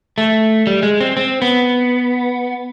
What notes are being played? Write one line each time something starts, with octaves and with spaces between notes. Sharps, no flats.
A3
G3
G#3
C4
C4
B3